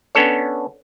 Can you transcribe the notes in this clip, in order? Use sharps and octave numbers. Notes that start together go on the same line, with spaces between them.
B3 C#4 D4 A4 C#5